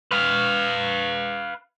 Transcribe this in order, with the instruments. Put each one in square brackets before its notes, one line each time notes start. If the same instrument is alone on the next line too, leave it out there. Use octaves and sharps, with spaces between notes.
[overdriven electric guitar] B4 F5